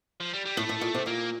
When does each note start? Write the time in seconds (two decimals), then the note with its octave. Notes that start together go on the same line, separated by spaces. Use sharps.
0.20 F3
0.33 G3
0.45 G3
0.57 A2 A3
0.69 A2
0.81 A#2
0.94 C3
1.06 A#2 A#3